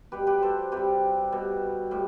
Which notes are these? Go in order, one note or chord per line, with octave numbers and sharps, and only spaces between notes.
B2 G3 G4 B4
G4 B4
A4 C5
C3 G3 G4 B4
B2 G3
A2 G3